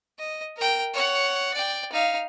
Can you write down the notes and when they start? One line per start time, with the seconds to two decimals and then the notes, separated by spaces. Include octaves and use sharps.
0.19 D#5
0.57 A#4 G5
0.94 C#5 F#5
1.54 D5 G5
1.92 D#4 F5